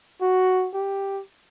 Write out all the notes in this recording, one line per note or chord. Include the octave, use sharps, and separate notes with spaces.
F#4
G4